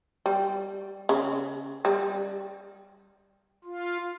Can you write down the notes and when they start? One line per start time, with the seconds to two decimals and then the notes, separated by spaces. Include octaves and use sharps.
0.26 G3
1.09 C#3
1.85 G3
3.65 F4